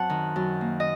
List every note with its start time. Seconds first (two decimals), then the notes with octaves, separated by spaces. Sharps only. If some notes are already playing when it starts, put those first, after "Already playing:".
Already playing: F#2 C4 F#5 A5
0.10 D#3
0.36 F#2
0.61 A#3
0.80 D#5